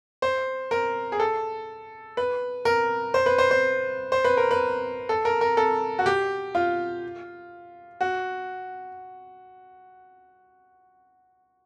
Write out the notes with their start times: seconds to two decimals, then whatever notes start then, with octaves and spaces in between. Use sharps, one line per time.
0.22 C5
0.71 A#4
1.12 G#4
1.20 A4
2.17 B4
2.65 A#4
3.14 C5
3.26 B4
3.38 C5
3.51 C5
4.12 C5
4.24 B4
4.37 A#4
4.51 B4
5.09 A4
5.25 A#4
5.41 A#4
5.57 A4
5.99 F#4
6.06 G4
6.55 F4
8.01 F#4